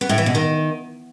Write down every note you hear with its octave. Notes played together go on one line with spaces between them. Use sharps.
B3
A2
E3
B2
D#3